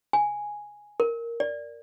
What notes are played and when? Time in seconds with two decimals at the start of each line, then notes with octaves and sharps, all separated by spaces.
0.13 G#5
1.00 A#4
1.40 D5